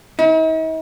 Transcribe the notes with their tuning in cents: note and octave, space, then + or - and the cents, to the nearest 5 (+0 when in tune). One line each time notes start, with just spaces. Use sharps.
D#4 +45